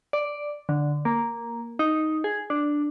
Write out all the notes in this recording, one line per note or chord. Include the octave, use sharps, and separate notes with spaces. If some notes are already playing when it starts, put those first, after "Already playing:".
D5
D3
A#3
D#4
G#4
D4